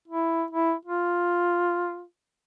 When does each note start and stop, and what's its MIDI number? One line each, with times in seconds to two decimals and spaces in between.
0.08 0.44 64
0.51 0.73 64
0.85 2.03 65